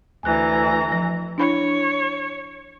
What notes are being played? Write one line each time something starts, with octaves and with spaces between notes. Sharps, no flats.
D2 E3 G#5 A#5 F#6
F3 A#6
D4 E4 C#5 B5